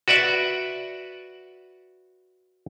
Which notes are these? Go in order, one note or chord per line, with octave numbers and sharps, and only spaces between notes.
F#4 B4 D5 E5 F#5